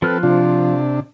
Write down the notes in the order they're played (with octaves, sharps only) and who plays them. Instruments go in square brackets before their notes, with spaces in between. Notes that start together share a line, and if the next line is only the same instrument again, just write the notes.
[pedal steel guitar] F3 F6 F#6 [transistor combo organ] C4 A4 B4
[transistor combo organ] C3 D4 [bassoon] F4